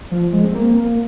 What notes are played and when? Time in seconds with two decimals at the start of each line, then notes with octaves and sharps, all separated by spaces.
0.12 F3
0.33 G#3
0.45 C4
0.55 A#3
0.77 A#3